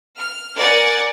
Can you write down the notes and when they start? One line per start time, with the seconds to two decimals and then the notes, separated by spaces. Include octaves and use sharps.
0.17 F6
0.56 A#4 D5 F#5 G#5 A6